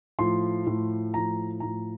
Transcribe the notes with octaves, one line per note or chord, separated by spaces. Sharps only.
A2 F3 C6
A2 F3
A2 F3 A#5
A2 F3 A#5